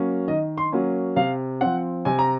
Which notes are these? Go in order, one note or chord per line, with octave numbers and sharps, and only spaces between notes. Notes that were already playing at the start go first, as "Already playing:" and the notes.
Already playing: F#3 A#3 C#4
D#3 D#5
C6
F#3 A#3 C#4
C3 F5
F3 C4 F#5
C3 G#5
A#5